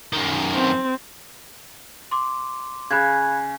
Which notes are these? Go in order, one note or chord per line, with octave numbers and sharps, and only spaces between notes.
F#2 D#3
C4
C6 D6
C#3 B5 F#6 G#6